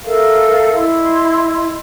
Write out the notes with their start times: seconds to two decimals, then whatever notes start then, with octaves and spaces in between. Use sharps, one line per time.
0.04 A4 A#4 E5 F5
0.75 E4 D#5 C6